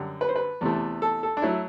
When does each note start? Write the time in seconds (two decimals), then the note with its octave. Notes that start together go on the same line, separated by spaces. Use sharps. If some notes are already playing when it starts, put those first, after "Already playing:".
Already playing: F#2 D3 G3
0.21 B4
0.29 C5
0.36 B4
0.61 E2 C3 E3 A3
1.02 A4
1.23 A4
1.37 D4
1.42 F#3 A3 E4